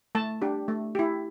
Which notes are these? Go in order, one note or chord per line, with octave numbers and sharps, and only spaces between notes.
A3 A5
D4 G4
A3
E4 G4